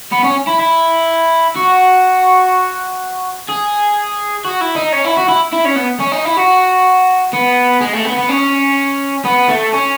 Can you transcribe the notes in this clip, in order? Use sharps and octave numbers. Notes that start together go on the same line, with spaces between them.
B3
C#4
E4
E4
F#4
G#4
F#4
E4
D#4
C#4
E4
F#4
E4
E4
C#4
B3
C#4
D#4
E4
F#4
B3
G#3
A3
B3
B3
C#4
B3
A3
C#4